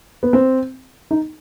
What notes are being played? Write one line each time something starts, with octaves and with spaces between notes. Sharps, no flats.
B3
C4
D#4